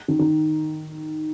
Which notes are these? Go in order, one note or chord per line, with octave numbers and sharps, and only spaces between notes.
D#3
D#3